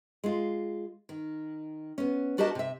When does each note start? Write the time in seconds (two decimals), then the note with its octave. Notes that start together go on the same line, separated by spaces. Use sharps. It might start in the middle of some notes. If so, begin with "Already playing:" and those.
0.24 G#3 F4
1.09 D#3
1.98 B3 C#4
2.38 D4 F#4 G4 A#4 D#5 A5
2.55 C3 E5